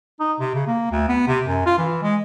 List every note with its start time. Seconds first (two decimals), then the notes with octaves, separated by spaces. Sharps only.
0.20 D#4
0.39 C3
0.55 C#3
0.67 A#3
0.91 D2
1.09 B3
1.27 C3
1.47 F#2
1.66 F4
1.78 E3
2.03 G#3